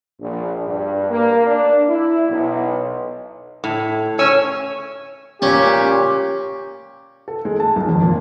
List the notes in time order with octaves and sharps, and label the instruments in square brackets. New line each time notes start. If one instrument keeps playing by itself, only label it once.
[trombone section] A#1
G2
A#3
D4
E4
B1
[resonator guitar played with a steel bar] A2
[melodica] C#4 G#5 E6 [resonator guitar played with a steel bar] C#5
[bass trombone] A#2 [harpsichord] C#4 [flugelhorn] G4
[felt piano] A4
G#3
A5
B1
F2
A#2